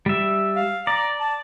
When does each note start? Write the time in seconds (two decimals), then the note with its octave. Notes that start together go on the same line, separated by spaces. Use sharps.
0.06 G3 E5
0.56 F5
0.87 D5 A#5
1.20 A5